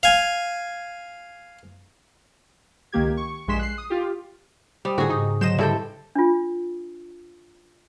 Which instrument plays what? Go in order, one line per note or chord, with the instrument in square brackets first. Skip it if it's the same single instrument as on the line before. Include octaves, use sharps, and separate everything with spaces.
[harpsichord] F5 G#5
[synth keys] C#2 D#3 A#3 G4 G#6
C#6
A#1 G2 G#3 C6 B6 E7
F#6 C7
D#6
F4 G4
[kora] G3 [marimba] C5 D6 D#6
[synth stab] A2 D3 [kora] F#4 G#4
[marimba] G#2 C#3 D#6 [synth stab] D#4
[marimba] D3 [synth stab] F#3 E7 [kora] C5 D#5
[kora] G2 A4 G5 [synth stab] C#3 G3 E4
[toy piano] D4 F4